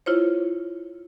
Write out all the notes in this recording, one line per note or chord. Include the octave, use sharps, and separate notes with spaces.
E4 F4 C5 C#5